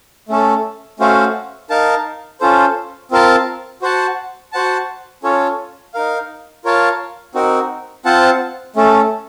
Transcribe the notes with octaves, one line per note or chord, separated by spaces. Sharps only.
A3 C#4 A4
A3 C#4 F#4 C5 F5
D#4 A#4 F5 A5
C#4 F4 A4 C5
C4 F4 A#4 F5 A5
F#4 C5 F#5 A5
F#4 C5 F#5 A5
C#4 F4 A4 C#5
D#4 A#4 F5
F4 A#4 C#5 F5 A5
C4 D#4 F#4 A#4
C4 F4 C5 F#5 A5
A3 C#4 A4